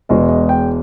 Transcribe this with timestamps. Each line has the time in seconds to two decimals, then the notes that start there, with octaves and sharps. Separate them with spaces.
0.09 E1 E2 B2 G#3 D#5
0.29 D#5
0.49 G5